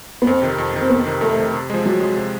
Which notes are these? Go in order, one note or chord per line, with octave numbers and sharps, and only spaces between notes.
B3
F2 C4
C3 D#3
F2
C3 D#3
C4
F2 B3
C3 D#3
F2 A3
C3 D#3
C3
F3 G#3
C3 F#3
F3 G#3
C3